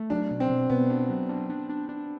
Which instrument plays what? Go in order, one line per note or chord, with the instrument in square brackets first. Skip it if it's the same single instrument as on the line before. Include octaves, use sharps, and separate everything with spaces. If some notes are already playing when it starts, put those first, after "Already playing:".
Already playing: [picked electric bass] A3
[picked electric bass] F#3 [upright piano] D4
[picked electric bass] B2
[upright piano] C4
[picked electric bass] B2
[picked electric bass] B2 [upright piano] B3
[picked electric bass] D4
F#3
D4
D4
D4
D4